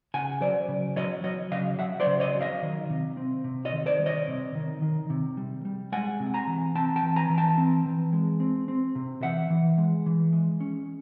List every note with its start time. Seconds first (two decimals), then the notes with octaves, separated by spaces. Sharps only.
0.14 C#3 F#5 G#5
0.41 F#3 C5 D5
0.68 C#3
0.96 F#3 C#5 D#5
1.24 F#3 C#5 D#5
1.51 C#3 D#5 F5
1.79 F#3 E5 F#5
2.00 C5 D5
2.06 C#3
2.20 C#5 D#5
2.35 F#3
2.41 D#5 F5
2.62 D#3
2.90 C3
3.17 C4
3.44 C3
3.65 C#5 D#5
3.73 D#3
3.86 C5 D5
3.99 G3
4.06 C#5 D#5
4.28 C3
4.55 D#3
4.82 D#3
5.10 C3
5.37 G3
5.65 G3
5.92 G#3 F#5 G#5
6.20 C3
6.34 G#5 A#5
6.47 E3
6.75 C4 G5 A5
6.96 G5 A5
7.03 E3
7.16 G#5 A#5
7.30 E3
7.38 G5 A5
7.58 C4
7.86 E3
8.13 G#3
8.40 C4
8.68 C4
8.95 C3
9.23 E3 E5 F#5
9.50 E3
9.78 G#3
10.06 E3
10.33 G#3
10.60 C#4